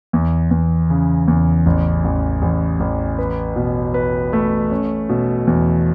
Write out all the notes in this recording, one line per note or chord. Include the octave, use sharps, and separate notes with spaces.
E2
E2
C#3
E2
A1
A1
A1
A1
B4
B2
B4
A3
C#4
B2
E2